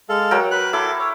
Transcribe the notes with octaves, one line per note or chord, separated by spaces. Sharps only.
G#3 A4 F5
F#3 A#4 G5
B4 F#6
E4 A4 D6
C#5